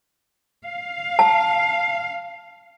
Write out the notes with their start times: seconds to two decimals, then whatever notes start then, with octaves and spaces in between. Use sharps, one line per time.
0.65 F5
1.19 A5